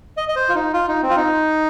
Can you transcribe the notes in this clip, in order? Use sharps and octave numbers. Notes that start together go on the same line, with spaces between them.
D#5
D#5
C5
F4
D#4
F4
D#4
C4
F4
D#4